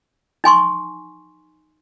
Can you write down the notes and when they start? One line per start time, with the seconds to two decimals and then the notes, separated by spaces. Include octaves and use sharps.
0.44 D#4 G#5 C6 C#6